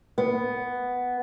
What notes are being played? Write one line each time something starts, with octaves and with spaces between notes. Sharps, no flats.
B3